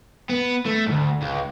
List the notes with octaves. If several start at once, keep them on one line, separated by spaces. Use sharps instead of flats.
B3
A3
D2 G#2
C#2